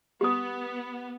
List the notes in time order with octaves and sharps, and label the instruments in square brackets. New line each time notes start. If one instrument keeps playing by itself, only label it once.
[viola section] B3 [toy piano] G4 D#6